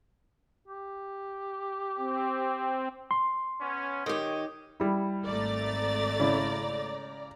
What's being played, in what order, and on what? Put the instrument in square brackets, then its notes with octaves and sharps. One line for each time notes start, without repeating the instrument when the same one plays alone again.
[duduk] G4
[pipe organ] C4
[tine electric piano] C6
[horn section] B3 C#4
[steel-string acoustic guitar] D#3 G4 [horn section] C#5 D#5
[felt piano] G3 E4
[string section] G#1 A3 A6 [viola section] D5 A#5
[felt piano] C#3 E4